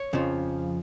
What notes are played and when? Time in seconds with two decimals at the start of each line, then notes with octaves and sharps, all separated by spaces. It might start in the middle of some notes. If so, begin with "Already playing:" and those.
Already playing: C#5
0.13 F2 C#3 F3